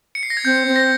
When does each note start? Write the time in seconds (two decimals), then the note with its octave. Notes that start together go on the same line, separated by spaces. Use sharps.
0.15 C#7
0.23 C7
0.30 A#6
0.37 G#6
0.45 C4 G6
0.68 C4
0.76 A#6